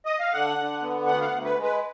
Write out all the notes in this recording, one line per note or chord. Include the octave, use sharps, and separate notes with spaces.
D#5
F5
D3 F#5
D3
B3
D2 F#5
F5
F#5
D2
B4
G#3
B4